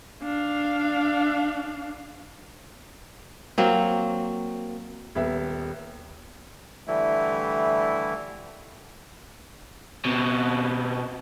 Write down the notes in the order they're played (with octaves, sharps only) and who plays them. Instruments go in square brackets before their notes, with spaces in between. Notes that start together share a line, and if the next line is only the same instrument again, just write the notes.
[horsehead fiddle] D4 F5
[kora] F#3 A#3 C4
[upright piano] D#1 B3 E5
[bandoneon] D3 E3 G3 A3 E4
[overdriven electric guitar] B2 C4